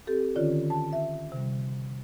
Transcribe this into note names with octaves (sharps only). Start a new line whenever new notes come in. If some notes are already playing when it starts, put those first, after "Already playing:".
C4 G4 A4
D3 D#3 C#4 F4 C#5 D5
A5
E5
C3 G3